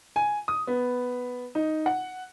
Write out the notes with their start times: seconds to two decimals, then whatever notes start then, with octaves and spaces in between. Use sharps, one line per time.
0.16 G#5
0.48 D#6
0.67 B3
1.55 D#4
1.86 F#5